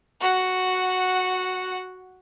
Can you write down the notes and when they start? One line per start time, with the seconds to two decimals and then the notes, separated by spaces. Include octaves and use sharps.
0.20 F#4 F#5